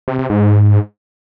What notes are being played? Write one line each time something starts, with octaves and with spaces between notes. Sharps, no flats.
C3
C3
G#2